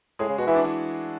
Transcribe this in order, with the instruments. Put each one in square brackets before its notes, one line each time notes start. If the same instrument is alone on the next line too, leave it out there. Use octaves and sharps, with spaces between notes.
[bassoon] A2 [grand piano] G#3 G#4
[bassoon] C#3
[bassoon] B2 [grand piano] F#4
[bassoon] E3 [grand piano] E4
[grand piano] D4
E3 E4